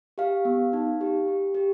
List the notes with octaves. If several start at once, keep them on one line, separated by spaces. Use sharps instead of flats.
G4 F5
B3
D#4
G4
G4
G4